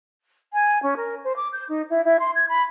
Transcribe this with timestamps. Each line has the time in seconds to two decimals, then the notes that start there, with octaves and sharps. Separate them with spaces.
0.53 G#5
0.82 C#4
0.96 A#4
1.24 C5
1.36 D6
1.53 G6
1.69 D#4
1.90 E4
2.04 E4
2.19 C6
2.35 G#6
2.48 B5